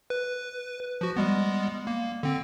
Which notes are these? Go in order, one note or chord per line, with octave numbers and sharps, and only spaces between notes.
B4
F3 F#4
G3 G#3 B3
A#3
D3 C4